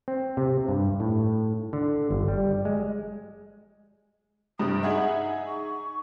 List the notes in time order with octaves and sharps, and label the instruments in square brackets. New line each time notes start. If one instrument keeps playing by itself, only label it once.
[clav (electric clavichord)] C4
C3
G2
A2
D3
G1
G3
G#3
[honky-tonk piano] G2 C3 [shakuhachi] D#6
[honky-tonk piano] D#4 G#4 E5 [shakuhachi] F#5
[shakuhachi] C#6